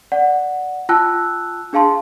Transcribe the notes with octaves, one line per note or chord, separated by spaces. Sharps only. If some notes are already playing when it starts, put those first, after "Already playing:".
D5 F#5
F4 G5 A5 E6 F#6
D4 G#4 F5 A5 C6